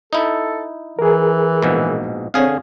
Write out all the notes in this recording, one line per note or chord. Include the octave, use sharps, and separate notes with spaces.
D#4 E4 A4
E3 G#4 A#4
A#1 G#2 B2
D3 C4 G#4 C#5 F5